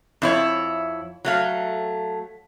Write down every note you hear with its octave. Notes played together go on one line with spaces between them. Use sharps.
F2 E4 C#5
F#3 A3 F5